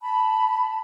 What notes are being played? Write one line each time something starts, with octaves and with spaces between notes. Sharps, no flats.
A5 B5